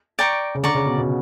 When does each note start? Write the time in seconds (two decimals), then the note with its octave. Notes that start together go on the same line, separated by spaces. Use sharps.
0.19 D5 G5 A#5 C#6
0.55 C#3
0.63 D3 D5 A#5 C#6
0.75 C#3
0.86 B2
0.98 B2